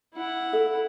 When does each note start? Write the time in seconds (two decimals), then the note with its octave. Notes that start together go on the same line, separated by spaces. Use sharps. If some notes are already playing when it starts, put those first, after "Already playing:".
0.14 E4 F#5
0.53 A4 E5